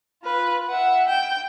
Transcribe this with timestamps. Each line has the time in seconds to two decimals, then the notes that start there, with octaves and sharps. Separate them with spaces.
0.23 F4 B4
0.68 E5 F#5
1.07 G5